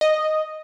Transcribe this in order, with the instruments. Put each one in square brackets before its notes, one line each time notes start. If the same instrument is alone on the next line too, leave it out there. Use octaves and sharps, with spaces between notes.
[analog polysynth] D#5